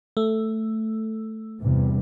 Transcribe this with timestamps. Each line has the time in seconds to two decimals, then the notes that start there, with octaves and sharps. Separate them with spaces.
0.17 A3
1.61 E2 G2 C3